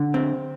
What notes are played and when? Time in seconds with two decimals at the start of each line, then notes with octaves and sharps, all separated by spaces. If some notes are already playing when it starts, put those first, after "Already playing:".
Already playing: D3
0.14 C4